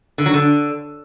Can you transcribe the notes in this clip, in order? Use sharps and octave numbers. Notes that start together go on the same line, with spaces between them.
D3
F#3
D3